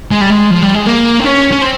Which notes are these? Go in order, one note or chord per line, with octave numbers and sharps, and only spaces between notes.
G#3
G3
G#3
F3
G3
G#3
A#3
C4
C#4
C#4
C4